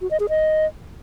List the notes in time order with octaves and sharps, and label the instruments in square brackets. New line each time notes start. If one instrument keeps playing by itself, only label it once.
[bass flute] F#4
D#5
G#4
D#5